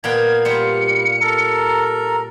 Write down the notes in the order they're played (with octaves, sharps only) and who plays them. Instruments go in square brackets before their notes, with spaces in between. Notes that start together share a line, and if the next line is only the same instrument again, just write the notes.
[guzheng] A#2 B3 G5 [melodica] F5 [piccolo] G#6
[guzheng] G3 F4 C5 [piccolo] C#7
[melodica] A4 A#4 A#5